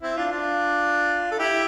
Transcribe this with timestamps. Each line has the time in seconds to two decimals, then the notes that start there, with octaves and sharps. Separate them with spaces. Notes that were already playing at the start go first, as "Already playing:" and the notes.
0.02 C4 E4
0.17 D4 F4
0.32 D4 F4
1.31 A4
1.39 E4 G4